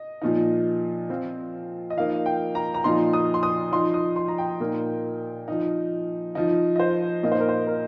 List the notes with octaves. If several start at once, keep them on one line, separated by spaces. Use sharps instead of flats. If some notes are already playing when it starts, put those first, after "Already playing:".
Already playing: D#5
A#2 F3 D#4
F3 C4 F4
D#5
F3 A#3 D#4 F5
G5
A#5
A#5
A#2 F3 D#4 C6
D#6
C6
D#6
F3 D#4 C6
D#6
C6
A#5
G5
A#2 A#3 D#4
F3 D#4
F3 D#4
D#5
C5
A#2 A#3 D#4 D#5
C5
A#4
C5
A#4